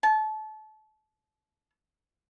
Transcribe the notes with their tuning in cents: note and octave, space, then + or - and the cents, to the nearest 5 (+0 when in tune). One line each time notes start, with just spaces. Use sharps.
A5 -30